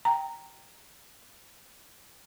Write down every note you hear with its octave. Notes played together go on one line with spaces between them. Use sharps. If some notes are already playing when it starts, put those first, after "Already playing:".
G5 A#5